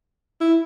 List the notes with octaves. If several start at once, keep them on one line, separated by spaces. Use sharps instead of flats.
E4